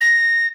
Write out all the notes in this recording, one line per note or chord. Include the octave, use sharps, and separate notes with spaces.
A#6